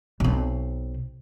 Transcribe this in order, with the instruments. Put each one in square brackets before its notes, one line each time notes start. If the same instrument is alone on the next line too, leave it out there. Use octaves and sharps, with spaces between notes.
[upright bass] B1 C4